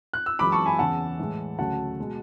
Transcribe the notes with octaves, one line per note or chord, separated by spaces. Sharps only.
F#6
E6
F#2 E3 G#3 B5 D6
A5 C#6
G#5 B5
E2 C#3 E3 F#5 A5
A2 E3 G#3
D2 C#3 F#3 A3 F#5 A5
B2 G#3